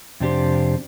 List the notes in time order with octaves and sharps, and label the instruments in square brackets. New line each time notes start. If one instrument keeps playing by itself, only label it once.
[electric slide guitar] F2 C3 D4 G4 C5